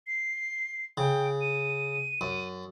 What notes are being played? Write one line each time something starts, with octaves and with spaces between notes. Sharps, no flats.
C7
C#3 G5
D#7
F#2